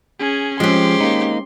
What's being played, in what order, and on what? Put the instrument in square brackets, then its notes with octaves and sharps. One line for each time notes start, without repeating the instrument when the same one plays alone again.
[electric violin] C#4 G#4
[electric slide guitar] F3 [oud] G#3 C4 [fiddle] C#4 G4 [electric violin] C6
[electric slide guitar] A#3 D#4